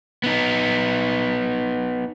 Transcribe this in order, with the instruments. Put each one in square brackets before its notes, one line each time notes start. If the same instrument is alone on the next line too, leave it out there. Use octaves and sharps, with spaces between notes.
[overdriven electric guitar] B3 D#4